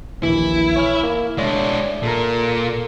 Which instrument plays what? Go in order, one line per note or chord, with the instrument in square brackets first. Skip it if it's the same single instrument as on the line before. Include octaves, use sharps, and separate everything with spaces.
[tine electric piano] A#1 D#2 E3 [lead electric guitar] E4
[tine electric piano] C#5 G#5 F6
A#3 E4
[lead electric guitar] G#3 D4 [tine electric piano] C#5 D5 E5
[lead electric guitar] A#2 [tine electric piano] A4 A#4